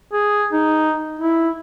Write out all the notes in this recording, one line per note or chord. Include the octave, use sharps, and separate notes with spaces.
G#4
D#4
E4